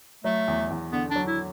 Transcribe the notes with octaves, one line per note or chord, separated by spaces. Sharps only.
F#3 A3
E2
E2
D3 B3
D4
F#3
E4